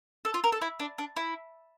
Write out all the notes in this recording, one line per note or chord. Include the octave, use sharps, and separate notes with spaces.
A4
F4
A#4
A4
E4
D4
D4
E4